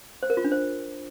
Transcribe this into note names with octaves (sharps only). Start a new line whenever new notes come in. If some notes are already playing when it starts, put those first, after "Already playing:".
C5
A#4
F4
D4
C5